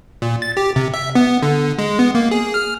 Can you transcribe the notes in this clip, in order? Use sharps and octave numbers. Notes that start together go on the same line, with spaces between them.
A#2
A6
G4
C3
E5
B3
D3
G#3
B3
A#3
G#4
F6